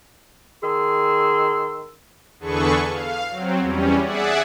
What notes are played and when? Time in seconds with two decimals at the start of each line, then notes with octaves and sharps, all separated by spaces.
0.62 D#3 G#4 C6 E6
2.39 E2 D3 G#4 A4 B4 C#6
2.90 F5
3.30 F#3 C4
3.60 E2 G3 C#4
4.01 G#4 D5 E5 F#5